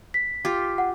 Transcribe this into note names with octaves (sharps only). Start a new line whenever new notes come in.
B6
F4 G4
F#5